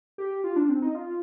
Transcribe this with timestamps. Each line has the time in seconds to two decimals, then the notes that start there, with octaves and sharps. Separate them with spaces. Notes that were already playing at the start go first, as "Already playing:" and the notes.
0.18 G4
0.44 F4
0.56 D4
0.69 C4
0.82 D#4
0.95 F4